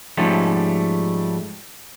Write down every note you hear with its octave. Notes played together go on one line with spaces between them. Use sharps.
G#2 F3 G3 A3 C#4